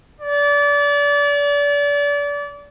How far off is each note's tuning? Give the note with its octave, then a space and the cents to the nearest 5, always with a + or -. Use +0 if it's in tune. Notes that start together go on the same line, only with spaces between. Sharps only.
D5 -30